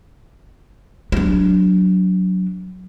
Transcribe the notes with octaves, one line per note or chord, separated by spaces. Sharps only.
F#3 D4